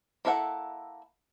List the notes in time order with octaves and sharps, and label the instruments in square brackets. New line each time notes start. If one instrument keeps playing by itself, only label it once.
[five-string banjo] A#3 E4 A4 E5 F#5